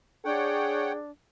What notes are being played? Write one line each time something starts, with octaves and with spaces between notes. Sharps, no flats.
D4 G#4 C#5 F#5 G5